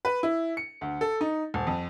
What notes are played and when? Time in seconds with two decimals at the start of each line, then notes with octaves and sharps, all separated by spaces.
0.05 B4
0.23 E4
0.57 C#7
0.81 D2
1.01 A4
1.21 D#4
1.54 D#1
1.67 F2